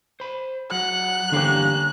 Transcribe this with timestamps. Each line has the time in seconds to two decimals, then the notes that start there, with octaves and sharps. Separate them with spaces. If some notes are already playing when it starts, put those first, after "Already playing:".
0.20 C5 B5
0.71 F#3 F#5 F#6
1.32 E2 G2 D3 A#3 C#4 G4 F5